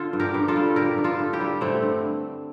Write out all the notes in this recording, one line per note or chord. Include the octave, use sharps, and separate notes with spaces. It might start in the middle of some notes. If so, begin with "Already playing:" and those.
Already playing: D3 F4 A4
G2
G4 A#4
G2
F4 A4
G3
D3 G4 A#4
G2
F4 A4
G2
E4 G4
G3
D3 A3 C4
G2